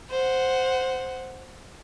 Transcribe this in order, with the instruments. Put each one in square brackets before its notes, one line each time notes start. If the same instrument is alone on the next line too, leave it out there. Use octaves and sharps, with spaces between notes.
[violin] C5 F#5